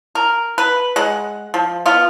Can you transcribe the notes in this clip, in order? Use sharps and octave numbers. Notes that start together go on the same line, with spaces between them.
A#4
B4
G#3 F#5
F3
B3 F4